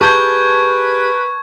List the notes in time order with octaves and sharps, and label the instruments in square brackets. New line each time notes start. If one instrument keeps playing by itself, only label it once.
[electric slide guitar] G4 G#4 [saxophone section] A#4 B4 [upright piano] A5 G6 [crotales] C#6 G#6